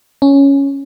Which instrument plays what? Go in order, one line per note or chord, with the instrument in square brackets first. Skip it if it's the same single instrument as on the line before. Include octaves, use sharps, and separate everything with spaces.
[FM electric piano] C#4